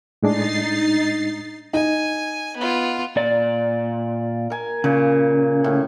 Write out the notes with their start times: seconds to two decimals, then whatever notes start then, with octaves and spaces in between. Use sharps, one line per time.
0.23 A2 G#3 D4 D#4 A6 C7
1.73 D#4 G#5
2.57 B3 F4
3.16 A#2 D5
4.50 A#4 G#5
4.84 A#2 C#3
5.64 A2